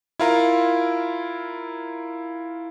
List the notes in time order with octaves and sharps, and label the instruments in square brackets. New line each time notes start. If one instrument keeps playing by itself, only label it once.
[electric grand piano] E4 F4 A#4